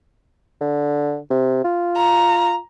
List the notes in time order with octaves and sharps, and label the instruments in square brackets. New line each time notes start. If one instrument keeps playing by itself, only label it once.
[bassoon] D3
C3
F4
[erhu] A#5